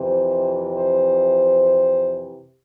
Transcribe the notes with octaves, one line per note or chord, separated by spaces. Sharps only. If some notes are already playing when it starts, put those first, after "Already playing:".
Already playing: F2 C3 E3 C5
C5